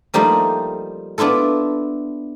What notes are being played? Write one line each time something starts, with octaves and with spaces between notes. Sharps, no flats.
F3 G3 A3 A#3 D#4 F4
B3 D4 E4 F4 A4